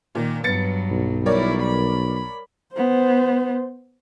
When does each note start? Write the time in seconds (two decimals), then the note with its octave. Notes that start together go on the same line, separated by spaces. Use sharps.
0.15 A#2 D#3
0.44 G2 F#3 B3 A6 C#7
0.91 B1
1.26 G3 E4 A#4 C#5 D5
1.63 B5
2.73 B3 C5